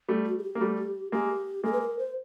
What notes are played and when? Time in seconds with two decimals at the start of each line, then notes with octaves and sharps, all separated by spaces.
0.09 G3 A3
0.27 F#4
0.38 G#4
0.43 G4
0.55 A#3
0.61 G3 A3
1.12 G#3 A#3 G4
1.63 G#3 A#3 A4
1.72 B4
1.81 A#4
1.99 C5